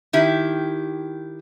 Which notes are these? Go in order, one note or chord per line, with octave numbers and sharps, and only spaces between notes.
D#3 E4 G4